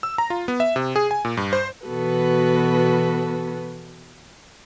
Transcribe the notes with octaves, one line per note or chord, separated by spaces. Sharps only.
E6
A#5
F4
B3
E5
C3
G#4
G#5
A#2
G2
C5
B2 E3 B3 F#4 A4 B4